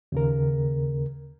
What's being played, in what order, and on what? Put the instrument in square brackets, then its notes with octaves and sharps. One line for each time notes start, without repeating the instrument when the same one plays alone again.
[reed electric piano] D#2 C#3 A#4